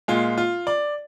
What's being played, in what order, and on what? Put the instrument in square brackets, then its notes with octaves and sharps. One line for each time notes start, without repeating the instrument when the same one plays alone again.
[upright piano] A#2 G#3 F4
F4
D5